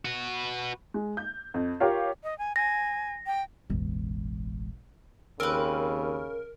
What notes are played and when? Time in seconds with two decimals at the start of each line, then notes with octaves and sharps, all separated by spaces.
0.05 F#4 B4
0.94 G#3
1.17 G6
1.54 F2
1.80 F4 G4 A#4 C#5 F5
2.23 D#5
2.38 G#5
2.56 G#5 A#6
3.26 G5
3.70 E1 A1
5.40 D#2 C#3 C4 A#4 B4